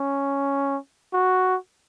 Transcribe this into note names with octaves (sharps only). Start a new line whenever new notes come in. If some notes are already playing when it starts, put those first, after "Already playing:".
Already playing: C#4
F#4